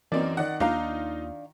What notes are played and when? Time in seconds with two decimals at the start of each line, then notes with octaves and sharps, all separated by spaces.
0.12 F#2 E3 A#3 C4 C#4 D#4 D5
0.37 D#3 D5 F#5
0.60 D#2 A#3 D4 D#4 F4 F5 A#5